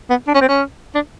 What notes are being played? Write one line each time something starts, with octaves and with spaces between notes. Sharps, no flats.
B3
D4
C#4
C4
C#4
D4